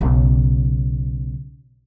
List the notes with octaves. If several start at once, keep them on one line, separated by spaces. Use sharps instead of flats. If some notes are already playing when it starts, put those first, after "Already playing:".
B1 C#3